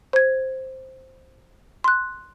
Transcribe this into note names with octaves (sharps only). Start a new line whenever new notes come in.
C5 G#6
C6 F#6